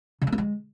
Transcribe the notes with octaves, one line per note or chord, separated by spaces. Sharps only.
C#3
A3
A#3
G#3